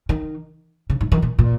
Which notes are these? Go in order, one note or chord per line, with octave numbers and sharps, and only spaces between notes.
D#3
C#3
G#2
D#3
A#2
A#2